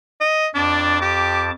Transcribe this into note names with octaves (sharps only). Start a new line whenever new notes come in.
D#5
F2 D4 A5 D6
G4